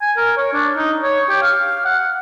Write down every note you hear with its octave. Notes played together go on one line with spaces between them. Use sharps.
G#5
A#4
C#5
D4
D#4
C#5
G4
F5
F#5